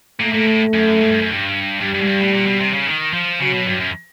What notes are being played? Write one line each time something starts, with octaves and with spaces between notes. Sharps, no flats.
A#2 A3
A#2
A2
F#2
G#2
G2
F#2
G2
G2 G3
G2
G#2
G2
A2
A#2
B2
C3
C#3
D#3
F3
C#3 F#3
B2
G2
F#2